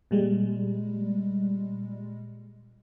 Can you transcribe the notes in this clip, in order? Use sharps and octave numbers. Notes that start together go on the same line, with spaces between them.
A#2 G3 G#3